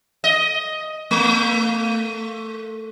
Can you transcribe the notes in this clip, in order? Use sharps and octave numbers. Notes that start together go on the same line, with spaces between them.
D#5
A3